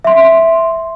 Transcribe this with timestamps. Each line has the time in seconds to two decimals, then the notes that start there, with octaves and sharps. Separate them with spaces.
0.04 E5 C6